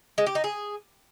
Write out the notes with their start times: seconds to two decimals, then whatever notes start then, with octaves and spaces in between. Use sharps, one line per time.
0.18 G#3
0.26 G4
0.35 D#4
0.44 G#4